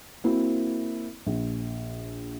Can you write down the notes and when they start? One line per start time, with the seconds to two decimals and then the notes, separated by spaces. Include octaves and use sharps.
0.24 A#3 C4 E4 F#4
1.27 A#1